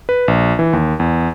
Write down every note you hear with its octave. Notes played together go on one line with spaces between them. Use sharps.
B4
A#1
E3
D#2
E2